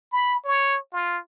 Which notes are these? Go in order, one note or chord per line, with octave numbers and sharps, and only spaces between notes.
B5
C#5
F4